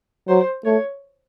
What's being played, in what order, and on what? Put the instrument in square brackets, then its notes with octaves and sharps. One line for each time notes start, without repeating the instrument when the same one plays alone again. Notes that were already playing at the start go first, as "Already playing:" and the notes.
[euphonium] F#3 [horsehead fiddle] C5
[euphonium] A3 [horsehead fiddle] C#5